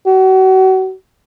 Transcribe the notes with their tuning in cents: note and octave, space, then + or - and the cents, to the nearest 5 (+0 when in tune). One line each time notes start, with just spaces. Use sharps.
F#4 +35